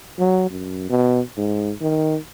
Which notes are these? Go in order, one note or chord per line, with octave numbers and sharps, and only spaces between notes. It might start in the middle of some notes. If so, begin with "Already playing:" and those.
F#3
F#2
B2
G#2
D#3